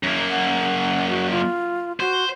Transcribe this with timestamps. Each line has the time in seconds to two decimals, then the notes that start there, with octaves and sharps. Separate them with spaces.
0.03 F#2 A#3
0.30 F#5
1.09 F#4
1.31 F4
2.00 F#4 C5